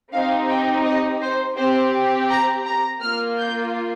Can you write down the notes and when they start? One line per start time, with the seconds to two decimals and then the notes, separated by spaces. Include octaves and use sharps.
0.13 C4 D#4 G4 F5
0.49 G5
0.85 D#5
1.22 C5
1.57 C4 G4 C5
2.31 A#5
2.66 A#5
3.02 A#3 F4 F6
3.39 G6